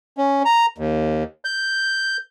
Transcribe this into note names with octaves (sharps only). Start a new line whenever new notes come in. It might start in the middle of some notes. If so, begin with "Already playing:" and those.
C#4
A#5
D#2
G6